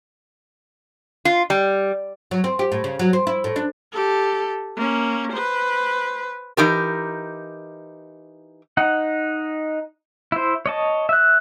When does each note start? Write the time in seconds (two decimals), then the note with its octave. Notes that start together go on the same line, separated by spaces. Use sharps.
1.25 F4
1.50 G3
2.31 F#3
2.44 C4
2.59 G4
2.72 A2
2.84 C#3
2.99 F#3
3.13 C4
3.27 E4
3.44 A2
3.56 D4
3.92 G4 A4
4.76 A#3 C#4
5.32 B4 C5
6.57 E3 D#4 G4 A#4
8.77 D#4 F#5
10.32 E4 C5
10.66 C#5 D#5 A5
11.09 E5 F#6